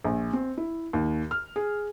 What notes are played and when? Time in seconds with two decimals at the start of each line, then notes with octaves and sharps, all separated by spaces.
0.04 A#1
0.33 C4
0.58 E4
0.93 D#2
1.31 F6
1.56 G#4